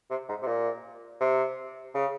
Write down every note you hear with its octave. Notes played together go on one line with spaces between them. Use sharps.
C3
G#2
C3
A#2
C3
C#3